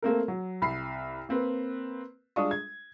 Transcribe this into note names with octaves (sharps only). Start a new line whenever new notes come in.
A3 A#3 C4 A#4
F#3
C2 B5 C7
A#3 C4 B4
G3 G#3 D4 F4 C#6 D#6
G#6